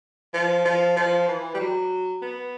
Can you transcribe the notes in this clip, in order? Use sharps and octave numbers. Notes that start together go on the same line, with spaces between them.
F3
F3
F3
E3
G3
F#3
B3